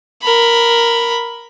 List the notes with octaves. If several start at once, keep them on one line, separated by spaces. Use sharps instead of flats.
A#4 B5